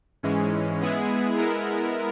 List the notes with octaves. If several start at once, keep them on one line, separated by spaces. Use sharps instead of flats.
G#2 E3 G#3 C#4
G#3 B3 E4 G#4
G#3 B3 E4 A#4